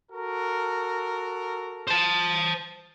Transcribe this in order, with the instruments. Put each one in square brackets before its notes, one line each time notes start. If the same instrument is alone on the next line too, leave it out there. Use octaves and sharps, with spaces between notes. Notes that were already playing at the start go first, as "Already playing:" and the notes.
[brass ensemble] F#4 A4 A#4
[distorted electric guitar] C5 A5